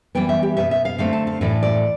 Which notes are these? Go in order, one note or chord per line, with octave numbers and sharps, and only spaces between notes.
E3 G3 B3 G5
E5
G4
B2 B3 E5
E5
F5
D3 A3 C4 F5
A5
F5
A2 E3 A3 D5
D5